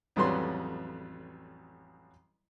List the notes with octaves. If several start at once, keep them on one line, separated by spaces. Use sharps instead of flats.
A1 F2 F#3 G3 B4 C6